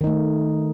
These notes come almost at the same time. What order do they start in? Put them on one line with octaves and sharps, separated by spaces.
D#3 D#4 A3